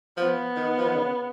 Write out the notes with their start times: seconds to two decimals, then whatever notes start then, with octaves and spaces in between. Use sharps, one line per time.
0.17 F3 B3
0.56 D#3
0.77 F3
0.86 D#3
0.95 C#3